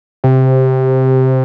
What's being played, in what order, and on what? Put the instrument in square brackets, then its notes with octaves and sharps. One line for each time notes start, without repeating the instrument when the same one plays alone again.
[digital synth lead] C3